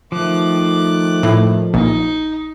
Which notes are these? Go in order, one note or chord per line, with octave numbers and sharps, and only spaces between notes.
D#3 F3 A3 D6 F#6
A2
A#1 D#4